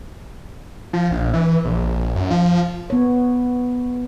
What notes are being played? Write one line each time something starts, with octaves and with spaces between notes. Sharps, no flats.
F3
A#1
E3
A#1
F#2
F3
B3 C#5